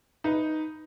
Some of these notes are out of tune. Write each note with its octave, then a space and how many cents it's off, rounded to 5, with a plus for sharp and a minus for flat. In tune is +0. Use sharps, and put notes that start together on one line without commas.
D#4 +0 B4 +0